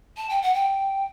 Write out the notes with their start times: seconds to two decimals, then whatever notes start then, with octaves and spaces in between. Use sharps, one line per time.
0.17 A5
0.29 G5
0.42 F#5
0.54 G5